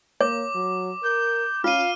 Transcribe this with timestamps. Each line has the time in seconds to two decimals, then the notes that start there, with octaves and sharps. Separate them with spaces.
0.21 A#3 C#5 D6
0.55 F#3
1.03 A#4 G6
1.64 C#4 F4 F5 F6 D#7